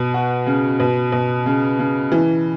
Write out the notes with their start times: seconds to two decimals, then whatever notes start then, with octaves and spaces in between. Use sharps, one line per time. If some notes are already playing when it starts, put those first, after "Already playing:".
Already playing: B2
0.14 F#4
0.46 C#3
0.80 B2
1.12 B2
1.46 C#3
1.79 C#3
2.12 E3